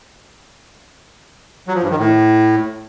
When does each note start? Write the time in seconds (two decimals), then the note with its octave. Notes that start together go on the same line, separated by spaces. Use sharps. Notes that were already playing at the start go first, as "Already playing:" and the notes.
1.67 F#3
1.75 F3
1.83 G2
1.91 D#3
1.99 A2